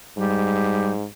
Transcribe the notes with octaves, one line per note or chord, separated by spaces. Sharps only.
G#2 G3